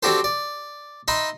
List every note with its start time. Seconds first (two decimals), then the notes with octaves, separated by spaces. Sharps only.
0.03 C4 D4 F#4 G4 A4 C5
0.24 D5
1.08 D#4 E5 B5 C6